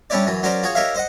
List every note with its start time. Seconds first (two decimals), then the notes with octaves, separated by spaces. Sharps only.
0.10 G3 C#4 D4 E4 C#5 D5
0.26 F#2 E3 F#3
0.43 F#3 C#4 A#4 C5 D5
0.63 F4 F#4 G#4 C#5
0.75 D#4 G4 A#4 C#5 E5 F5
0.95 C5 D#5 F#5